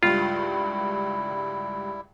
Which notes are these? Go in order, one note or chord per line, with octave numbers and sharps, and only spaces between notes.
C#2 G2 G3 E4 F4